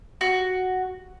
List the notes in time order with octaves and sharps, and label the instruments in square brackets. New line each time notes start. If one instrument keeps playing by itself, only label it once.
[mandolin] F#4